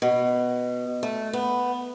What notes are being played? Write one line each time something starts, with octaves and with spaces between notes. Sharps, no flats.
B2
A3
B3